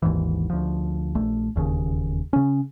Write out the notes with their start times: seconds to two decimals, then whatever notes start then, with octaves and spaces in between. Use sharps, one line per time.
0.02 G#1 D#2 G#2 E3
0.50 D2 F3
1.15 A#1 A3
1.56 E1 D#2 C#3
2.33 C#3 C#4